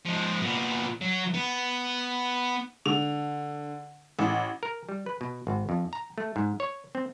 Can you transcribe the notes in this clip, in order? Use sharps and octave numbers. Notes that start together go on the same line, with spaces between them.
F3 G#3
A#2 B3
F#3
B3
D3 F7
A1
A#4
G3
B4
B2
G#1
F2
A#5
A3
G#2
C#5
C4